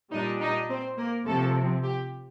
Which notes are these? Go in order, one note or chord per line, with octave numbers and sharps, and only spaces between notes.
A#2 G3 D4 D#4 D#5
D#4 D#5
C4 C5
A#3 A#4
C3 F3 A3 C4 A4
G4